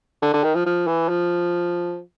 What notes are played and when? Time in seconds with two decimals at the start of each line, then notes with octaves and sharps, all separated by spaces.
0.22 D3
0.34 D3
0.44 D#3
0.55 F3
0.66 F3
0.87 E3
1.09 F3